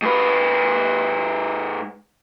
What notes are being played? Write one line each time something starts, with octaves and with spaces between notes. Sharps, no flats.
G#2 B4